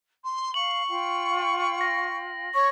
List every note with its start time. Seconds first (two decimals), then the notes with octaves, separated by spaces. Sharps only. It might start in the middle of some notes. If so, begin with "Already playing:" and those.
0.24 C6
0.54 F5 C#6 F#7
0.89 F4 F5 G5
1.81 A#6
2.54 C#5 C#6